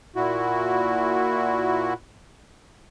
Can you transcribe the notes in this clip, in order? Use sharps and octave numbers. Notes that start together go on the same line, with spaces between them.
A#2 E4 F#4